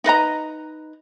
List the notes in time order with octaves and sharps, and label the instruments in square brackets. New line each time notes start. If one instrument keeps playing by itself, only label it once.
[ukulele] D#4 B4 D#5 A#5